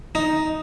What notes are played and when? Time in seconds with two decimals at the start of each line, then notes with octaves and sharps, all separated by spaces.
0.15 D#4